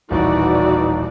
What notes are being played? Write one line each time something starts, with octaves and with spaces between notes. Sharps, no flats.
D#1 A1 E3 D#4 F#4 D5